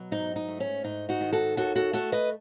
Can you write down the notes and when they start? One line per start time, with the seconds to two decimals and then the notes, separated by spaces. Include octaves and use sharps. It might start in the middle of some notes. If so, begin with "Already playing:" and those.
Already playing: B2 F#3
0.11 G#2 D#4
0.36 D#4
0.48 A3
0.60 C#4
0.84 G#2 D#4
1.09 D#4 F#4
1.21 D#3
1.33 F#4 A4
1.57 D#2 F#4 A4
1.76 F#4 A4
1.93 A3 F#4 A4
2.12 B4 D#5